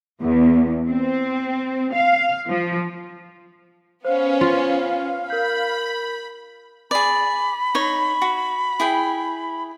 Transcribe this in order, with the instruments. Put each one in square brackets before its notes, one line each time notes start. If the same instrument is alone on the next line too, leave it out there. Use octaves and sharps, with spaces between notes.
[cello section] E2
C4
F5
F3
[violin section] B3 C#4 [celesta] C5 [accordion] F5
[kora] F4
[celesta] A#4 G6 [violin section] B5
[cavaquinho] G#4 D5 [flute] B5
[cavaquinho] D#4 C#5
F#4
E4 G#4 G5